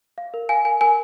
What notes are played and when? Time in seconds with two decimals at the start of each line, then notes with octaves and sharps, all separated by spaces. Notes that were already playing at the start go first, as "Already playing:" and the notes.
0.18 F5
0.34 A#4
0.49 F5 G#5
0.65 A#4 G#5
0.81 A#4 G#5